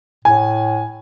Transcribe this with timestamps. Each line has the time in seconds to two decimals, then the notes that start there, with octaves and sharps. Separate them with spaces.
0.25 A2 G#5